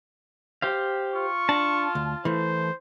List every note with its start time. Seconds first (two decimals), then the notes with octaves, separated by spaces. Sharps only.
0.62 G4 C5 F5
1.15 F4 C#6
1.49 D4 A5
1.95 D2
2.25 E3 A3 C5